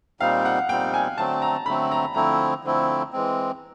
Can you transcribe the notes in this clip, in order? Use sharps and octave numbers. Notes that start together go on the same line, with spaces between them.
A#2 G3 C4 D#4 F5
F#5
A#2 G3 C4 D#4 G5
G#5
D3 F#3 A3 C4 A5
A#5
D3 F#3 A3 C4 B5
A#5
D3 F3 A3 C4 E4 A#5
D3 F3 A3 C4 E4
E3 G#3 C4